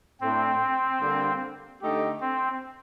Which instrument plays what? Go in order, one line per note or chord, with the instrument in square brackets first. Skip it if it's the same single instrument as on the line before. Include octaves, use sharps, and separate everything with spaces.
[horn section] A2 A3 D4 [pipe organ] C4
[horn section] D3 G3 A#3
D3 A3 D#4 G4
[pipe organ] C4